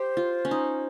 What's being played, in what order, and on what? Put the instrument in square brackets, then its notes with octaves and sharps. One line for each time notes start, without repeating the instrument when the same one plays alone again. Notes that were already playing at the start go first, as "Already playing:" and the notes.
Already playing: [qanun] G4 [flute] C5
[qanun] F4
C#4
D#4